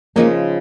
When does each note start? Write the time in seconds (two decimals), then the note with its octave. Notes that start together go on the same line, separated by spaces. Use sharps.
0.16 C#3 F3 G#3 A#3 D#4